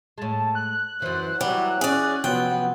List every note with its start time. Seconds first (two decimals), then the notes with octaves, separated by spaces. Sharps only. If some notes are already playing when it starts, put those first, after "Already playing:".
0.18 A2 G#3 A5
0.55 F#6
1.02 F#2 E3 C5
1.41 E3 F#3 G3
1.81 C#4 G#4 D5
2.24 C3 F3 F#3 B3 G5